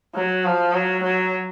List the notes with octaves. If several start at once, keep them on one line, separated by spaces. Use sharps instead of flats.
F#3
F3
F#3
F#3